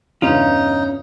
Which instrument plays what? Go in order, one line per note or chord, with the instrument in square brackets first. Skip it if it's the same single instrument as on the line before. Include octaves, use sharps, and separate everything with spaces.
[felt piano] E2 G2 C#3 [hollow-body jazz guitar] C#4 F4 [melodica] D#4